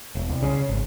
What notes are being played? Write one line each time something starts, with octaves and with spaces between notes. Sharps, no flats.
E1
C2
C#3
G#1